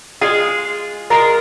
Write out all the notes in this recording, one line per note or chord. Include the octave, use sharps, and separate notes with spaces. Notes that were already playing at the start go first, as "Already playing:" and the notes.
G#3 F4 G#4
G#3 F4 A#4